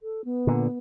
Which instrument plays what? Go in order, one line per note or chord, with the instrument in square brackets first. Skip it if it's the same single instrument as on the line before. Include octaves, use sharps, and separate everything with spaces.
[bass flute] A4
B3
[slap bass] A#2 D3